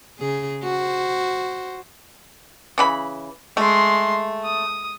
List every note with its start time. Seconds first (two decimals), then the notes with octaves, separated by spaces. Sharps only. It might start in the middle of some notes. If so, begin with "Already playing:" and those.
0.19 C#3 G#4
0.64 F#4 C5
2.78 C#3 E3 B5
3.57 G#3 A3 C6
4.44 D#6